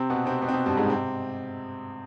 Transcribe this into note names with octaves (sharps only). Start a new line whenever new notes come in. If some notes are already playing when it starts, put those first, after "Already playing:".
Already playing: C3 C4
B2 B3
C3 C4
B2 B3
C4
B2 B3
G2 G3
G#2 G#3
C3 C4